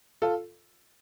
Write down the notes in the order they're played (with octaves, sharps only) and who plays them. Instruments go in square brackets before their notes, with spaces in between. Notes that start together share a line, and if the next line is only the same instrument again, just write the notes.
[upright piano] F4 A4